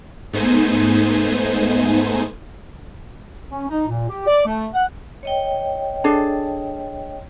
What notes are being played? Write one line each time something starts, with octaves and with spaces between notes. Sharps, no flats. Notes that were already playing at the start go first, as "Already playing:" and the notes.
G#2 A3 B3 D#4 C5 G#5
C#4
D#4
A#2
G4
D5
A3
F#5
C#5 D#5 G5
D4 G#4 A4